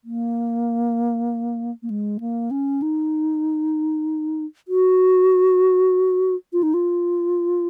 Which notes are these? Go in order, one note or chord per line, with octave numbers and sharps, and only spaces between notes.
A#3
A#3
G#3
A#3
C#4
D#4
F#4
F4
D#4
F4